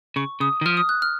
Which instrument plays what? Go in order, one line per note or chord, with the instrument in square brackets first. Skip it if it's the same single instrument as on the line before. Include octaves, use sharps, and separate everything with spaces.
[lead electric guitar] C#3 [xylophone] C#6
[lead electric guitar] C#3 [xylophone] D#6
[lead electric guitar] D#3
[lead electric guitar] F3 [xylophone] F6
[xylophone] D#6
F#6
F6